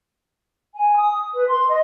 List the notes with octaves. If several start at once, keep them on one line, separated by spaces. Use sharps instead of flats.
G#5
D#6
B4
C6
D#5